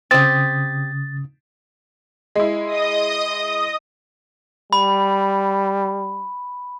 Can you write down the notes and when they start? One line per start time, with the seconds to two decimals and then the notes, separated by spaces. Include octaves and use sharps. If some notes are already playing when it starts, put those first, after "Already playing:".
0.11 C#3 C4 G4 D#6 A6
2.35 G#3 E4
2.67 D#5 D#6
4.73 G3 B5